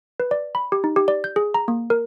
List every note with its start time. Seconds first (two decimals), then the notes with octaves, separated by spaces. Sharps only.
0.20 B4
0.31 D5
0.55 B5
0.72 G4
0.84 D#4
0.96 G4
1.08 D5
1.24 G6
1.36 G#4
1.54 A#5
1.68 A#3
1.90 A#4